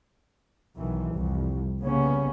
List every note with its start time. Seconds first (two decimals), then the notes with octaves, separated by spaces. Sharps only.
0.79 B1 D#3 E3
1.14 C2 F2
1.80 C#3 G3 A#3 B3 C#4